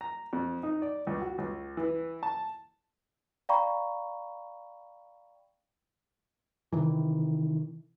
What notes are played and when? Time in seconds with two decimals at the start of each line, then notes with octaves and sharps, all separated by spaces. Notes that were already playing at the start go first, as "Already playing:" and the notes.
0.01 A#5
0.33 F2
0.63 D#4
0.82 D5
1.07 C#2
1.22 F#4
1.38 C#2
1.77 E3
2.23 A5
3.49 D5 F5 G5 A#5 B5 C#6
6.73 C3 D#3 E3